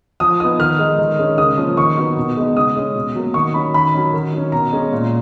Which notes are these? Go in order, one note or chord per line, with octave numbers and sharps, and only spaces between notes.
F3 D#6
B3 D#4 D#6
D#3 F6
G#3 D#4
D#3
G#3 C#4
C#3 D#6
F3 A#3 C#4
D#3 C#6
F#3 B3 D#4
B2
G#3 B3 D#4
C#3 D#6
G#3 C#4
B2
F#3 A#3
D#3 C#6
F#3 C#4 B5
D#3 B5
F#3 C#4
D#3
F#3 C#4
B2 A#5
G#3 C#4
A#2